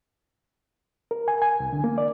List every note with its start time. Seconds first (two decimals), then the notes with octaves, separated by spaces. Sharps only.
1.11 A#4
1.28 G#5
1.42 G#5
1.60 C2
1.73 D3
1.84 A#3
1.98 D5